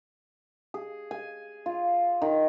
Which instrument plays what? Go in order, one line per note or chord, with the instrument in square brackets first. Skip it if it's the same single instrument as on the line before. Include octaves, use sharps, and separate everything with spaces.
[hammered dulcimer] G#4
G#5
F4
D#3